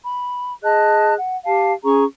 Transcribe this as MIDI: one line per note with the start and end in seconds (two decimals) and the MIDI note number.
0.04 0.53 83
0.64 1.15 68
0.64 1.15 75
0.64 1.15 81
0.64 1.15 90
1.18 1.36 78
1.46 1.73 67
1.46 1.73 77
1.46 1.73 81
1.84 2.04 61
1.84 2.04 68
1.84 2.04 82
1.84 2.04 85